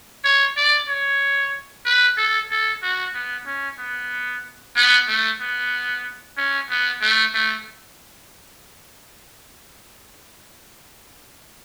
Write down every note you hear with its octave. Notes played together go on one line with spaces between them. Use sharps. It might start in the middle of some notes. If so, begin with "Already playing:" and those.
C#5
D5
C#5
B4
A4
A4
F#4
B3
C#4
B3
B3
A3
B3
C#4
B3
A3
A3